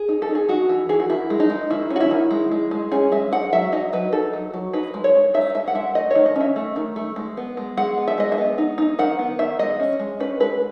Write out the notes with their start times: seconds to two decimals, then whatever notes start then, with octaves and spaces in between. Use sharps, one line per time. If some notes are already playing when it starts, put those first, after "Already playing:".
Already playing: G#4
0.09 D#4
0.22 A4
0.29 D#4
0.35 G#4
0.49 D#4 F#4
0.69 E3
0.89 E3 G#4
1.00 F#4
1.09 D#3 E4
1.30 G#3
1.40 D#4
1.50 G#3
1.71 D#3 E4
1.90 C#4
1.96 F#4
2.00 E4
2.11 D#3
2.31 G#3
2.51 G#3
2.71 G#3
2.92 C#4 G#4
3.12 G#3 E5
3.32 G#3 F#5
3.53 F#3 E5
3.72 D#4 D#5
3.93 F#3 B4
4.13 D#4 A4
4.33 F#3
4.54 F#3
4.73 D#4 B4
4.94 G#3
5.04 C#5
5.14 D#4
5.34 D#4 E5
5.55 G#3 E5
5.68 F#5
5.75 G#3 E5
5.95 A3 D#5
6.11 D#3 C#5
6.26 D#5
6.36 C#4 E5
6.56 A3
6.76 D#3
6.96 A3
7.16 G#3
7.37 B3
7.57 G#3
7.77 G#3 F#5
7.98 B3
8.08 E5
8.18 G#3 D#5
8.32 E5
8.38 B3
8.58 D#4
8.78 D#4
8.99 D#3 F#5
9.19 B3
9.39 D#3 E5
9.59 G#3 D#5
9.80 C#4
10.00 G#3
10.20 C#4 B4
10.40 G#3 B4